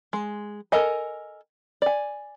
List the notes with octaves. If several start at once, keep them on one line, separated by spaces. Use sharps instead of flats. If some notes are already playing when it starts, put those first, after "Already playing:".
G#3
A4 A#4 D#5 G#5
D5 G#5